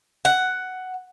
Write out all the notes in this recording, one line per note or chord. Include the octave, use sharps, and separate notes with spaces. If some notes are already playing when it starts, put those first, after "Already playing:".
F#5